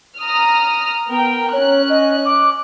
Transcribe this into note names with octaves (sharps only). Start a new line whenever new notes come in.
A#5 D#6 F6
B3 A#4 G5
C#4 C#5 F#6
D#5
D6